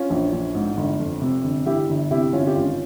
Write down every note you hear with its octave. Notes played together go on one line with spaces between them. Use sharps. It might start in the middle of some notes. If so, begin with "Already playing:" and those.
Already playing: C#4 F4
A#1
A#1
G#2
G1
F2
C3
G1
G1 E4 G4
G1
C3 E4 G4
G1 C#4 F4
G4
G#1 C#4 F4